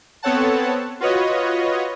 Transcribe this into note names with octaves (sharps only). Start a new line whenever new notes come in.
B3 C4 A4 C#5 F#5 A5
F4 F#4 B4 C#5 D#5